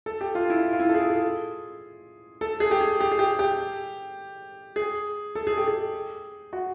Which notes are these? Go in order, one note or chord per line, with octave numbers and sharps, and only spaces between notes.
A4
G4
F4
E4
F4
E4
A4
G#4
G#4
A4
G#4
G4
G#4
G4
G#4
G4
G4
G#4
A4
G#4
G4
G#4
F#4